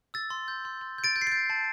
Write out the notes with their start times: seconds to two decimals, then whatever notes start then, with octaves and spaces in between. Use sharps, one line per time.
0.14 E6 A6
0.30 C6
0.48 G6
0.65 C6
0.81 C6
0.98 G6
1.04 A6 D7
1.16 G6
1.21 C7
1.27 G6 A6
1.50 A5